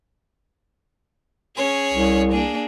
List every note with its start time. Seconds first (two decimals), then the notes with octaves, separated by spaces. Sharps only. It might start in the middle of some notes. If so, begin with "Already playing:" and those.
1.57 C#4 G#4 C#5
1.93 C2
2.32 A#3 D4 G#4